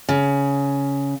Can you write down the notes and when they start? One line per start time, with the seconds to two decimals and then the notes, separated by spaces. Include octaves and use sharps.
0.09 C#3